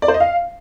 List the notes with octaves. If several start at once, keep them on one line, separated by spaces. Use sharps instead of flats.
D5
C5
D#5
F5